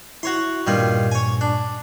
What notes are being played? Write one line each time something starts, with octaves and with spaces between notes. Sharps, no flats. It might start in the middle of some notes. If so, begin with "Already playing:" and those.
E4 F#4 C#5 C6
G2 A#2 D#3 G3 F4 G#6
C#5 G#5
D4